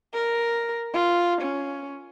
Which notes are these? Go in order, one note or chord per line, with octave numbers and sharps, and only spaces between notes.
A#4
F4
C#4